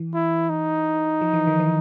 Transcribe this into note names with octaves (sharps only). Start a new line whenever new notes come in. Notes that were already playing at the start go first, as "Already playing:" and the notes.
Already playing: E3
E4
D#4
F3
E3
D#3
E3